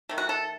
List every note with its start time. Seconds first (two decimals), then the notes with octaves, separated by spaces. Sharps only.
0.09 D#3 A3
0.18 F#4
0.29 A4